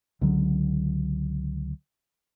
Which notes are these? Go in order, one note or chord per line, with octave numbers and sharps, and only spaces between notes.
C#2 D3 F#3